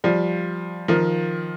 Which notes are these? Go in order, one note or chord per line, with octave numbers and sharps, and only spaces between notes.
F3 G3
D#3 F3